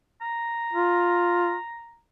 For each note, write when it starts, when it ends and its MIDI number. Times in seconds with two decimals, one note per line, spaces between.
0.22 1.99 82
0.73 1.55 65